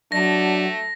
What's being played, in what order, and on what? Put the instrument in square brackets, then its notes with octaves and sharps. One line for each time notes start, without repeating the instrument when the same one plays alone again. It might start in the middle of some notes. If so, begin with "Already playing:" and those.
[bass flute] F#3 [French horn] A3 [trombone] D4 [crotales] A#6